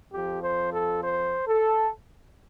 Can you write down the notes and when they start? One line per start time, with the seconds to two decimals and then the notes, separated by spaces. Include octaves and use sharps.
0.11 F2 F3 G4
0.42 C5
0.72 A4
1.02 C5
1.47 A4